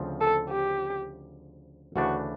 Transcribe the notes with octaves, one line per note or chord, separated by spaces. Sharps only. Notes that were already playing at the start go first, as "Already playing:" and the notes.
Already playing: D2 C#3 F3 C4
A4
G4
D2 C#3 E3 A3 D4 F#4